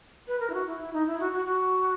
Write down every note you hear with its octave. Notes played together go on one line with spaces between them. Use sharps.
B4
A#4
E4
F#4
E4
E4
D#4
E4
F#4
F#4
F#4